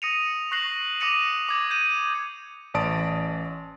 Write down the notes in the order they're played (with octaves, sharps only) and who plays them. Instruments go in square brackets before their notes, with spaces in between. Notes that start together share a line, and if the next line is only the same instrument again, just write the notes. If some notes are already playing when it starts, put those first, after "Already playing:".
[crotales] D#6 A#6 C#7 D#7 F7
C#6 F#6 A#6 C7 F#7
D6 D#6 A#6 C#7 D#7 F7
D6 G#6
G6 D#7
[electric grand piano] A1 D5 A5 D#6 D7